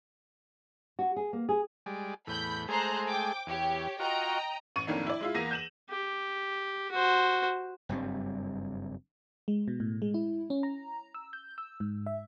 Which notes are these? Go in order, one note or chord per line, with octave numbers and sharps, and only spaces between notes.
F#4
G#4
A#3
G#4
G3 G#3 D5
E2 A2 B5 G6
G#3 A3 G#4 C5 A#5 F#6
G5 D6
E2 G4 C#5
F4 F#4 D#5 G5 A#5 C#6
A1 C#6 D#7
F2 A2 D#3 A#3 D4
E4 D5
G#3 E4 F4
E2 A#3 A#6 D#7
G6 E7 F#7
G4
F#4 C5
F#1 G2 G3 C4
G#3
B2
A2
G#3
E4
C#4
A#5
E6
G6
E6
G#2
E5